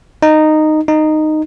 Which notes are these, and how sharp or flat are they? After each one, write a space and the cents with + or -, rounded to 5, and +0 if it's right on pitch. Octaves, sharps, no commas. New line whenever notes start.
D#4 -10
D#4 -10